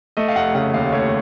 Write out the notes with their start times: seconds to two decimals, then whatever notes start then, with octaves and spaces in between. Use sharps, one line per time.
0.17 A3 D#5
0.28 F5
0.36 F1 F#5
0.55 C#3 F#5
0.74 D#2 F5
0.92 A3 C#5